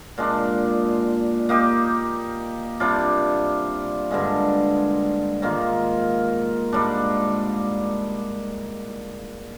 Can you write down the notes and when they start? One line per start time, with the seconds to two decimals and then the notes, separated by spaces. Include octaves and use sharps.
0.18 A#2 G#3 D4
1.49 A#3 D#4 G4
2.80 C3 G3 D4 F4
4.11 G2 D3 G#3
5.42 G#2 D#3 A#3 F4
6.72 G#2 G3 D4